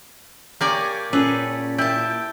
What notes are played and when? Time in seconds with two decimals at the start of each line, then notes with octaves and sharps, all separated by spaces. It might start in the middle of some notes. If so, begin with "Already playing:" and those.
0.61 A#3 G4 C#5 D5 G#5
1.13 A#2 C#4 G#4 A4 B4
1.78 E4 G5 A5